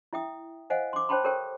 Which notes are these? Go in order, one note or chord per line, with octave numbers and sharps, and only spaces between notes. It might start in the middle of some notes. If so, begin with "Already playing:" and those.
E4 E5 G5 D#6
C5 D#5 F5 F#5 G#5
C6 D6
C5 C#5 G5 A5 B5 C6
G4 A4 A#4 C5 C#5 G5